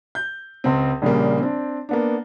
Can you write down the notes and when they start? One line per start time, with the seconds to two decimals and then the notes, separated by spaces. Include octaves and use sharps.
0.15 G6
0.64 C#2 C4
1.02 A#1 C#3 G3 A#3
1.41 C4 D4
1.89 A#3 B3 D4